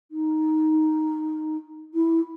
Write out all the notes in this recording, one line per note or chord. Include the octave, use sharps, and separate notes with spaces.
D#4
E4